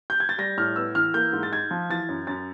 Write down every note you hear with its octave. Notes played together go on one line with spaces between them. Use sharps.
G6
G#6
A6
G3 A#6
A2 F6
B3 E6
E3 F6
A#3 G6
G#2
A6
D#4 G#6
F3
E3 A6
F#2
F#2 A6